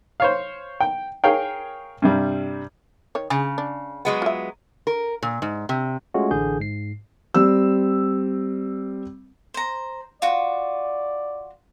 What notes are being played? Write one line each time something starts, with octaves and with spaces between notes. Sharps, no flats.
C5 C#5 F5
G5
G#4 A#4 C#5 F5 G5
G2 C3 G3
D#3 C#5
C#3 G#4
D4
F#3 G#3 B3
F4 E5
A#4
A#2
G#2
C3
G#3 A3 C#4 F4 F#4
A1 D3 E3 G#4 G6
G#2 C7
G3 C4 E6
C5 A#5
F4 F#4 D5